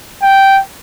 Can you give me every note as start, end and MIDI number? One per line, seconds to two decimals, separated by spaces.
0.22 0.58 79